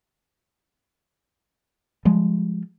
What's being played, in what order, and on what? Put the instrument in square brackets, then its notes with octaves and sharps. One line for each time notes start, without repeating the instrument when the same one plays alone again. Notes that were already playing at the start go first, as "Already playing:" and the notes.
[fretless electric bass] F3 G3 G#3